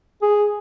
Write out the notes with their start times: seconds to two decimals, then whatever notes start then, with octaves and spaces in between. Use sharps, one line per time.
0.22 G#4